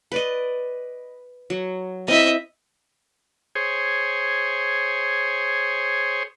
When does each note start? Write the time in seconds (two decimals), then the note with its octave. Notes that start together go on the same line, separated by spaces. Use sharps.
0.12 B4 D5 D#5
1.50 F#3
2.08 C4 E4 D#5 E5
3.55 G#4 C5 C#5